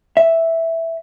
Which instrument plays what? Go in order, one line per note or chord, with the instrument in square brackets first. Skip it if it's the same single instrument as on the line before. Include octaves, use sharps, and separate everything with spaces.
[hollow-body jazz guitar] E5